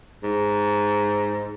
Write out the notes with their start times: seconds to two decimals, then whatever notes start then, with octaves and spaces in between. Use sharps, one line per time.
0.23 G#2